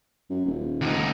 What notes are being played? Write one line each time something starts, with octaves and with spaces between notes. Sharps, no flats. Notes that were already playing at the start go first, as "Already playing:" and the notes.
F#2
D#1
D2 D#4